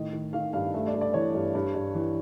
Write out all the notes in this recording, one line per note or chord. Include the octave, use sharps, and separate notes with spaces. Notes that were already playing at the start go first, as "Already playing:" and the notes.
Already playing: A2 D#3 D#5
D#3
D#3 F5
G2 F5
A3 E5
D5
G2
D5
E3 C#5
G2
G2
G2
E3